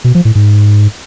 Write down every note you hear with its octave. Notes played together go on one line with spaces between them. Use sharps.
B2
F3
A2
G#2